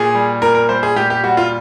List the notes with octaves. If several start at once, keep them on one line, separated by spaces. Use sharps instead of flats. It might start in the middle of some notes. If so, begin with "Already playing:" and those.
Already playing: A#2 G#4
G3
A#2 A#4
A#4
G3 C5
G#4
A#2 G4
G4
G3 F#4
F4